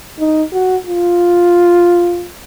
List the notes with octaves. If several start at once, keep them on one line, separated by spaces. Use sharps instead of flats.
D#4
F#4
F4